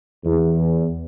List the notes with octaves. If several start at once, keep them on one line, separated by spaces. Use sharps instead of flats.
E2